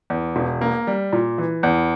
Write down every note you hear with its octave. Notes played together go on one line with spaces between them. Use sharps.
E2
E1
A#3
G3
A#2
E3
E2